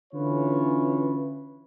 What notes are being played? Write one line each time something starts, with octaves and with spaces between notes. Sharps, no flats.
D3 E3 C#4 F4 B4 C#5